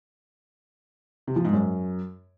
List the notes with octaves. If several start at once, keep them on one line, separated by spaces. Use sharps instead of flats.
C3
F3
G#2
F#2